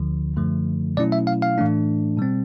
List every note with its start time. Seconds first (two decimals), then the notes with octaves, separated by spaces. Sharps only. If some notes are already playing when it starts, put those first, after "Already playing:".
Already playing: D2 D3 F3
0.37 F#2 D3 F3 A3
0.97 B2 F#3 A3 C#4 E4 D5
1.12 E5
1.27 F5
1.42 F5
1.58 A2 E3 A3 D4
2.17 B2 G3 C4